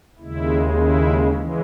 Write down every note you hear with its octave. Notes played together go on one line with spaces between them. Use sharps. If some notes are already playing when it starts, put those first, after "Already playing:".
D#2 C#3 G#3 E4
E4
C#3 E3 G#3